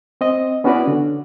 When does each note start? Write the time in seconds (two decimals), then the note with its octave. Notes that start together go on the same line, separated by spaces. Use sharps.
0.21 C4 D#5
0.64 B3 C#4 E4 F#4 B4 D5
0.87 D3